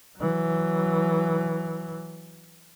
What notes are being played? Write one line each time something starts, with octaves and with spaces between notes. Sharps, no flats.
E3 F#3